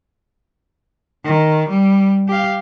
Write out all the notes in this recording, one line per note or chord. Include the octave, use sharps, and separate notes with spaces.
D#3
G3
G4 F5